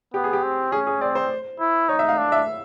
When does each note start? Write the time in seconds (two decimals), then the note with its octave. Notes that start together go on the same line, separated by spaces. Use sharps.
0.14 B3 G4
0.24 G#4
0.33 G4
0.43 C4
0.72 C#4 G#4
0.87 G#4
1.01 C4 D5
1.15 C5
1.60 E4
1.89 D#4 C#5
1.99 E5
2.09 F5
2.18 D4
2.32 E5